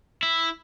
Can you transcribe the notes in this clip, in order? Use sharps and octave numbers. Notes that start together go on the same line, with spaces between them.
E4